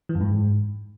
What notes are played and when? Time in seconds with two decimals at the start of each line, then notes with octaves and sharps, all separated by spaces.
0.09 E3
0.15 F#2
0.21 G#2